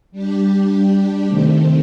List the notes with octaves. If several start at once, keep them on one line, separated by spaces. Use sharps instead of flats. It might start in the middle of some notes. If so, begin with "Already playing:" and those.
G3 D4 G4
C3 D#3 A3 C4